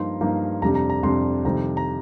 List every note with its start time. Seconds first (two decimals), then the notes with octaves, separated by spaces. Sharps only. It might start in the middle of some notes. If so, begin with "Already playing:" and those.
Already playing: G2 F3 A#3 D#4 C6
0.21 G2 F3 A#3 D#4
0.62 F2 C3 G3 D4 A#5
0.75 A#5
0.90 A#5
1.03 F2 C3 G3 D4 C6
1.45 F2 C3 D#3 G3 A#5
1.77 A#5